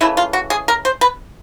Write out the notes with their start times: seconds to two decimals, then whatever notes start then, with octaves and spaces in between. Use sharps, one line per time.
0.01 C#3 E3 A3 E4
0.17 F4
0.33 F#4
0.50 G#4
0.68 A#4
0.85 C5
1.01 B4